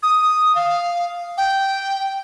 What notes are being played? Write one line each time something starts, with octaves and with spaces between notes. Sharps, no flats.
D#6
F5
G5